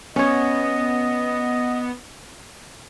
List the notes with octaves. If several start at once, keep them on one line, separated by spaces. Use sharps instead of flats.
B3 C#4 C#5 D#5